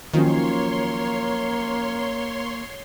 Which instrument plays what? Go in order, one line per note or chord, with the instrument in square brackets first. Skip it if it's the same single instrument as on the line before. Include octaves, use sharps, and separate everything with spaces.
[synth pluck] D#3 [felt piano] F3 F#3 C#4 [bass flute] A#3 [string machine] C#5 C6